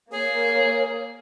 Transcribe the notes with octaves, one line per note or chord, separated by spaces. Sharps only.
A#3 G#4 C#5